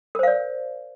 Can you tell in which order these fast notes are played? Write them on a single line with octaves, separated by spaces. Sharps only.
A#4 C5 F5 D5